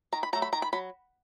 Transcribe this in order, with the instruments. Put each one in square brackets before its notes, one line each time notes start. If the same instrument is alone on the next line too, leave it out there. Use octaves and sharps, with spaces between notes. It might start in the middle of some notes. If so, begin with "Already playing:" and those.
[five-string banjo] D#3 A#5
B5
F#3 A3 A#5
B5
D#3 A#5
B5
F#3 B5